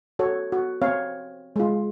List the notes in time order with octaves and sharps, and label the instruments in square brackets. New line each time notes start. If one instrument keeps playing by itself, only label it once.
[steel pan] F#4 A4 C#5
F#4
C4 C#5 F5
G#3 F4